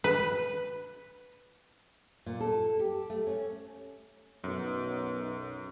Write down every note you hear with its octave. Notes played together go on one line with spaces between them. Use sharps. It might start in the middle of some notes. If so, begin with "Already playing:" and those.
B4
A#2
A4
G4
A3
C#4
B1 F#2